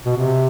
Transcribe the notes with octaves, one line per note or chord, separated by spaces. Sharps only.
B2
C3